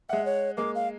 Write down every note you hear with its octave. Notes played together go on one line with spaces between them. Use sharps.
G#3 E5 F#5
C#5
G#3 A#3 D6
F5